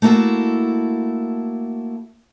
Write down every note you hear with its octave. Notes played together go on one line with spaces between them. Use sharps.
A3 A#3 E4 F#4 A4